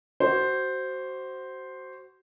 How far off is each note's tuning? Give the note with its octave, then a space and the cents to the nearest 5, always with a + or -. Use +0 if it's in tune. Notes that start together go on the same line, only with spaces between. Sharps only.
F#4 +25 C5 +0